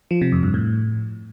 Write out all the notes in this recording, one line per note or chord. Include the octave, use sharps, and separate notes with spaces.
F3
C3
F2
G2
A2